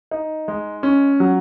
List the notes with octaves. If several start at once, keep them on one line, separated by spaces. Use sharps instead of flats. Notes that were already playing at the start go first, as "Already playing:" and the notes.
D#4
G#3
C#4
F#3